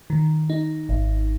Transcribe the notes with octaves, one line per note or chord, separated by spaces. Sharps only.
D#3
D#4
G#1